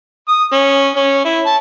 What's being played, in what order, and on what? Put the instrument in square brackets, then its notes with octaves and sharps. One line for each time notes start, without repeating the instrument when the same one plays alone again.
[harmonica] D#6
C#4
C#4
E4
A5